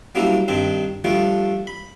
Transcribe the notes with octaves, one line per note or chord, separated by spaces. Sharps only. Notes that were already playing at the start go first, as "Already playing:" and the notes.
F#3 G3 A#3 C#4 D4 E4
G2 D#3 C4 D4
F3 G3 A3 D4
B5